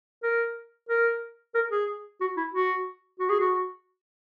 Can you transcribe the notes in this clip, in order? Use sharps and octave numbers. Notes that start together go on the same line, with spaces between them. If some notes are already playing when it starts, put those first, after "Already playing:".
A#4
A#4
A#4
G#4
F#4
E4
F#4
F#4
G#4
F#4